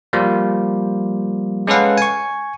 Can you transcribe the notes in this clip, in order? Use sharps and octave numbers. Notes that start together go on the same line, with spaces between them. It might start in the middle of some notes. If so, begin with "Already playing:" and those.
F3 G3 A#3
G#3 C#4 A4 B4 F5 F#5
G#5 C#6